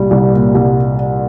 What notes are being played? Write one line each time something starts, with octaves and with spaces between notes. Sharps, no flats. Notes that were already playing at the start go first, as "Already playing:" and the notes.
Already playing: C2 A#2 G3
C2
A#2
C2